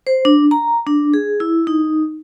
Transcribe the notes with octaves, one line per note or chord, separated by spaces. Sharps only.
C5
D4
A#5
D4
G#4
E4
D#4